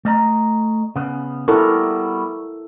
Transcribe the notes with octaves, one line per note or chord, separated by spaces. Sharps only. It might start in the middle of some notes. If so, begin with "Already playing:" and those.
A3 D#5 A#5
C#3 B3
G3 B3 E4 F#4 A4 A#4